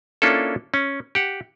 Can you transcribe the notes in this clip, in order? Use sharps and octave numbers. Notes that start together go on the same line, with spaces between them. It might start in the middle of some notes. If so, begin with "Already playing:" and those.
A#3 C#4 D4 E4 F4 A4
C#4
G4 F#5